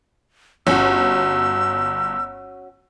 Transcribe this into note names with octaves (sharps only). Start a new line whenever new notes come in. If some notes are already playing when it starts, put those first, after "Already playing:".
G1 C#4 F#4 E6